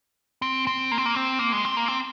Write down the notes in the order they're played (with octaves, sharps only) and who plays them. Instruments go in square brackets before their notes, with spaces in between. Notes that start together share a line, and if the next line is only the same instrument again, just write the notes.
[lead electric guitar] C4
C4
A#3
C4
A#3
C4
A#3
G#3
C4
A#3
C4